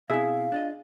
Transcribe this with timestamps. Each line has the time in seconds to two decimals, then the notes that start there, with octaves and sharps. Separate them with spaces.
0.10 B2 C4 E4 G#4 E5 F5
0.52 D4 F4 D#5